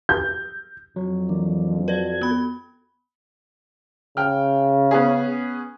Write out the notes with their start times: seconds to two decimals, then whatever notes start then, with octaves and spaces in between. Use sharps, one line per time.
0.09 G6
0.96 F2 F#3
1.29 E3 A#3 D4
1.88 F#4 A4 B4 D5 G#6
2.21 B3 B5
4.17 C#3 G5 F6
4.91 B3 C#4 G#4